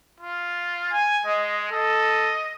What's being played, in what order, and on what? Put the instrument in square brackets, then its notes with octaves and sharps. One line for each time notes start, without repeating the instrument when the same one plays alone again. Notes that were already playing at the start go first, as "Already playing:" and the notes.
[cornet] F4
[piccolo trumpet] G#5
[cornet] G#3 [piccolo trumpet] D#5
[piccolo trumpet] A4 [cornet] D#5